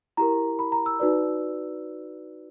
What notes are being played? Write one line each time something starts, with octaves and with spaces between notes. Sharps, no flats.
E4 G4 A#4 A#5
B5
A#5
E6
D#4 F#4 B4 D5